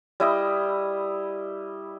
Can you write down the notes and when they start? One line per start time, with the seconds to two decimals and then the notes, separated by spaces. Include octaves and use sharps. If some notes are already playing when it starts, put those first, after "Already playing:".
0.20 G3 E4 D#5